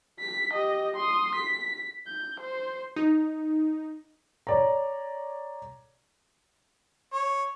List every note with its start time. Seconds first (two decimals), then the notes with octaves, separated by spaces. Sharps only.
0.19 B6
0.53 G4 D#5
0.96 C6 D#6
1.35 B6
2.07 G6
2.40 C5
2.96 D#4
4.47 C#5 D5 A#5
7.13 C#5